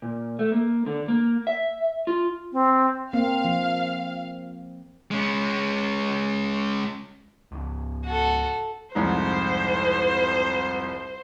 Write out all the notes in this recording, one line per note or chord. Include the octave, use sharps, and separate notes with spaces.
A#2
A3
A#3
D3
A#3
E5
F4
C4
A#3 C4 F5
F3
G#3 C#4
C#2 G#2
F#4 A4
C2 F2 G#2 C5